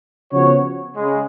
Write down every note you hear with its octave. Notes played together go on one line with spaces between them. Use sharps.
C#3 F3 B3 F#4 C#5
C#3 G#3